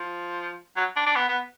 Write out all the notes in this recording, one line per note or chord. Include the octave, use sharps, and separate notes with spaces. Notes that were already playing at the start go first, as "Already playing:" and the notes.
Already playing: F3
F#3
D4
D4
B3
B3